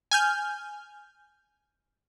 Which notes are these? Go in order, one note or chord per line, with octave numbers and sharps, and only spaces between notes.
G#5 F6 G6